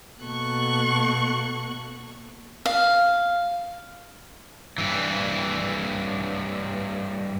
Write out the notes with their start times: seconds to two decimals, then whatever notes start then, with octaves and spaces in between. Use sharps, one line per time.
0.21 B2 A#3 A4 C#6 F#6
2.66 F5
4.78 G2 E3